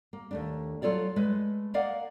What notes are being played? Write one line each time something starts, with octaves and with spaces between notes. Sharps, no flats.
A#3
D#2 A3 D4
F#3 F4 A4 C#5 D5
G#3 A3 B4
A#3 A#4 D5 D#5 F5 F#5